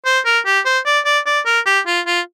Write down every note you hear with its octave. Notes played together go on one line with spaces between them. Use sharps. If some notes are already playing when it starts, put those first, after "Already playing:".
C5
A#4
G4
C5
D5
D5
D5
A#4
G4
F4
F4